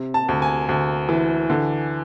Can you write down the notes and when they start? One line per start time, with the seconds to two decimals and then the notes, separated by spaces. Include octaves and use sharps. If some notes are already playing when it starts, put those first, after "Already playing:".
Already playing: C3
0.14 A5
0.29 D2
0.42 G#5
0.69 D2
1.09 E3
1.50 D3